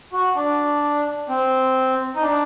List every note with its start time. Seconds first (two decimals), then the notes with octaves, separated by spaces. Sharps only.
0.12 F#4
0.35 D4
1.29 C4
2.15 D#4
2.22 D4